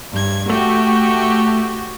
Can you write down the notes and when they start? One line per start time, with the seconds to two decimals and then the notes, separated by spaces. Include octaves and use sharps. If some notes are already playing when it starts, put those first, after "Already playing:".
0.12 G2 G#6
0.50 A3 F#4 G4